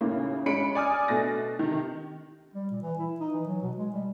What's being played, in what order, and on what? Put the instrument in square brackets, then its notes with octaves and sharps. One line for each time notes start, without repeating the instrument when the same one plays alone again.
[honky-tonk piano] D#2 A2 C#3 A#3
G#3 C#4 D4 B5 C#7 D7
D5 G#5 D#6 F6
B2 A3 D4 A6 A#6
C3 D#3
[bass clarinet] G3
A#2
E3
E4
D#4
E3
F#3
B2
G#3
G3